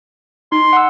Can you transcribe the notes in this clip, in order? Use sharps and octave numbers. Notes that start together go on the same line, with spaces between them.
D#4 C6
F#5 E6